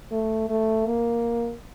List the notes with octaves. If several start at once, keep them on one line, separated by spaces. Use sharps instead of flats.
A3
A3
A#3